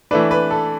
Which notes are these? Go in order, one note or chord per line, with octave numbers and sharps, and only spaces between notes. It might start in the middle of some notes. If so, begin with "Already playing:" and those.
E3 A3 D4 B4
B4
A4